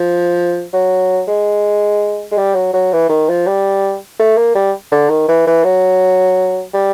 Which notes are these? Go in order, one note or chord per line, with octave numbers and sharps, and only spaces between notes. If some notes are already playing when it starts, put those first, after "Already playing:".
Already playing: F3
F#3
G#3
G#3
G3
F#3
F#3
E3
D#3
F3
G3
A3
A#3
G3
D3
D#3
E3
E3
F#3
G3